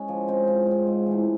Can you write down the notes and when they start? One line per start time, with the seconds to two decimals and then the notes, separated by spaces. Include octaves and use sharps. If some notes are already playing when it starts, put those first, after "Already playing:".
Already playing: G#3 C#4
0.08 F3
0.28 G#3 C4
0.48 F3
0.67 G#3 C4
0.87 G#2
1.07 E3 A3